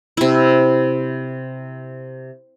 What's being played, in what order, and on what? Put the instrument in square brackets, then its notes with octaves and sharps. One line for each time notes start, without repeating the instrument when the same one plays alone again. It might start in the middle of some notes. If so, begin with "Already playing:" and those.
[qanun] C3 E4